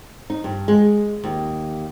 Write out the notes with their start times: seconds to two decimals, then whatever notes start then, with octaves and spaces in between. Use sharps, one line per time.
0.30 D#4
0.44 G2
0.68 G#3
1.24 D#2